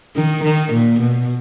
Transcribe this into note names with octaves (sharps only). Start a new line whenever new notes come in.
D#3
D#3
A#2
B2